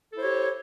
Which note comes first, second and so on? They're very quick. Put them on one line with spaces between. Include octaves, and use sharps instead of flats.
A4 E4 C5 C#5 G4